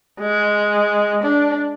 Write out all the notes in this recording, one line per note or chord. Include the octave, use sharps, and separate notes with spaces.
G#3
D4